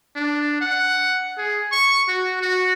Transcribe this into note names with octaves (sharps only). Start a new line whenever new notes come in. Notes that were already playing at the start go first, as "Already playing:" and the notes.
D4
F#5
G#4
C#6
F#4
F#4